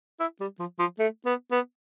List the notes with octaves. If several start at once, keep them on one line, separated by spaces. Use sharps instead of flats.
E4
G3
F3
F3
A3
B3
B3